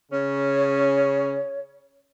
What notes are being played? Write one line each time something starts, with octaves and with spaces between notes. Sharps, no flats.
C#3 C#4 C#5